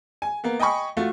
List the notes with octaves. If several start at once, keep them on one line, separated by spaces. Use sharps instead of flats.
G#5
A#3 B3
D#5 G5 G#5 B5 C#6
A3 F4 F#4